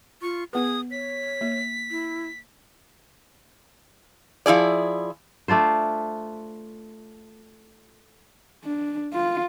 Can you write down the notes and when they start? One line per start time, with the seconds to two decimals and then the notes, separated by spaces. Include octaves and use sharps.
0.22 F4 C#6
0.53 B3 G#4 B4 D#6
0.91 C#5 B6
1.41 A#3
1.91 E4
4.46 F3 E4 G#4 D5
5.48 A3 D4 F4 C5
8.64 D4
9.13 F4